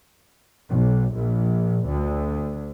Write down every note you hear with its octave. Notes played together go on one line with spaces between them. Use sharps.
B1
A#1
D2